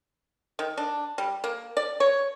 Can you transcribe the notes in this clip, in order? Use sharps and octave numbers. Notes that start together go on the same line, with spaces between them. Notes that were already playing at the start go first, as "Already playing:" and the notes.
D#3
D4
G3
A#3
D5
C#5